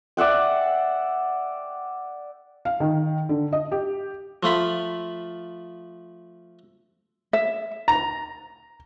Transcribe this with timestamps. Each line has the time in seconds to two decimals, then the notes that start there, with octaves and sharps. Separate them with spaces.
0.17 D5 E5 F#5 G5
2.65 F5
2.80 D#3
3.29 D3
3.53 D#5
3.72 G4
4.43 F3 A3 F4 B5
7.33 E5
7.88 A#5